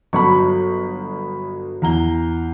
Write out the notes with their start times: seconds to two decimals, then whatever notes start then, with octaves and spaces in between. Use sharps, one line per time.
0.13 G1 F#3 B5 C#6
1.82 E2 A#5 G7